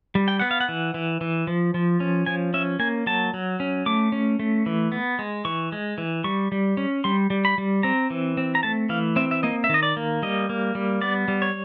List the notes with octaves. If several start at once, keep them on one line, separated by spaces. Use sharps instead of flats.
G3
G5
B3 F#5
F5
F#5
E3
E3
E3
F3
F3
C#4
F3 G#5
C#4 E5
A#3 G#5
F#3 A5
F#3
C#4
A3 D6
C#4
A3
E3
B3
G#3
E3 C#6
G#3
E3
G3 C#6
G3
C#4
G3 C6
G3
B5
G3
C4 A#5
E3
C4
A#5
A3 A5
E3 F5
C4 E5
E5
A#3 D#5
E5
D#3 D#5
D5
A#3
G3 D#5
A#3
G3
B3 D5
G3
C#5